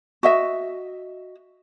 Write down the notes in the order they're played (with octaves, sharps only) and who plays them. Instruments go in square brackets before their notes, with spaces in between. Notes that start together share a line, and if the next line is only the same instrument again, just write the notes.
[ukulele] F#4 D#5 E5